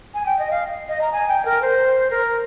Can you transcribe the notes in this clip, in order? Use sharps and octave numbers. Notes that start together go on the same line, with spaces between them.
G#5
G5
D#5
F5
D#5
A#5
G#5
G5
A#4
C5
A#4